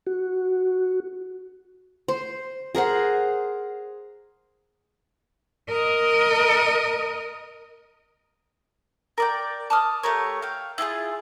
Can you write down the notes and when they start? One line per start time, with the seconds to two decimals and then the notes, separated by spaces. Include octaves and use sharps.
0.07 F#4
2.08 C5
2.75 G#4 A#4 C5 F#5
5.69 A#4 D#5
9.18 A#4 D5 G5
9.70 A5 D6 D#6 F6
10.03 A3 G4 A#4 C#5
10.42 F5 G5
10.78 E4 F4 G4 G#4